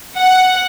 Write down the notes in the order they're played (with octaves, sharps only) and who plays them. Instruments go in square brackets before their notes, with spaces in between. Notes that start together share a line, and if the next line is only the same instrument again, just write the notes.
[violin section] F#5